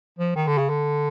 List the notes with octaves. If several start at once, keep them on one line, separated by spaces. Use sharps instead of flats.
F3
D#3
D3
C#3
D3